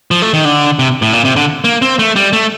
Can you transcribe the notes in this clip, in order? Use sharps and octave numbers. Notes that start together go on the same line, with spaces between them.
F3
A3
D#3
D3
C3
A2
A#2
C3
D3
A#3
C4
A3
G3
A3